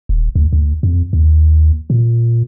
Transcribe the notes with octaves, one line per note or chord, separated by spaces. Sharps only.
D#1
D2
D2
F2
D#2
A#2